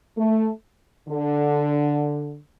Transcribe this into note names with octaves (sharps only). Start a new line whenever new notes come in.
A3
D3